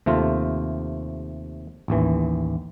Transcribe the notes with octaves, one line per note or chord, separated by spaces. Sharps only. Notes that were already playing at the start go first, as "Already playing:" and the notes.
D#2 C3 A3 F4
A1 D#2 E3